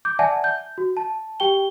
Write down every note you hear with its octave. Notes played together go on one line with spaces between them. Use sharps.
D6 G6
D5 E5 F#5 G#5 A5
G6
F#4
A5
G4 G5 G7